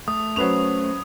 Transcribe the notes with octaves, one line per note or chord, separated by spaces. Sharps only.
A3 D#6
F#3 C#4 B4 C5 F7